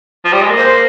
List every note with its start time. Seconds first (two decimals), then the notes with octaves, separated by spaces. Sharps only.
0.25 F3
0.33 G3
0.42 G#3
0.49 A#3
0.58 C5